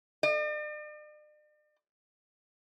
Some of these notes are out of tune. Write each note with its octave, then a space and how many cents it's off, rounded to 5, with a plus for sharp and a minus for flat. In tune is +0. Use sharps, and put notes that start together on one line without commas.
D5 +45